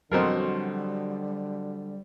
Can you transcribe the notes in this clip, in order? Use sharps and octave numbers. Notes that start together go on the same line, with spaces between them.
F2 B2 D3 F#3 G3 F#4 A#4 C5